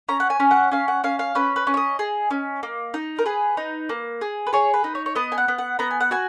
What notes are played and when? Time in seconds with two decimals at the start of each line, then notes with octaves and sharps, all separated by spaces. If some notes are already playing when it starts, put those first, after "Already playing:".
0.09 C#4 A#5
0.20 F#5
0.30 G#5
0.40 C#4
0.51 F#5
0.72 C#4 F5
0.88 F#5
1.04 C#4 F5
1.19 F5
1.35 C#4 B4
1.56 B4
1.67 C#4
1.74 C#5
1.77 D#5
1.99 G#4
2.31 C#4
2.63 A#3
2.94 D#4
3.19 A#4
3.26 G#4 B4
3.57 D#4
3.89 A#3
4.21 G#4
4.47 B4
4.53 G#4 C#5
4.74 B4
4.84 D#4
4.95 C#5
5.06 C#5
5.15 B3 D#5
5.32 G#5
5.38 F#5
5.48 B3
5.58 F#5
5.79 B3 A#5
5.91 G#5
6.01 F#5
6.11 F#4 G#5